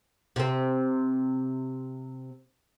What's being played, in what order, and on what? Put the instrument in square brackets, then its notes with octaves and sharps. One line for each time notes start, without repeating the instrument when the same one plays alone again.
[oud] C3 C4